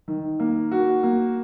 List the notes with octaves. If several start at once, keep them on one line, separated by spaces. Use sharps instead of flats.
D#3
A#3
F#4
A#3